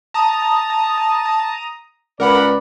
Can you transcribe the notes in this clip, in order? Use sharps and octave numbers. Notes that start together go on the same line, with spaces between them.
A5 A#5 D#6
C#2 A#4 B4 D5 F#5 B5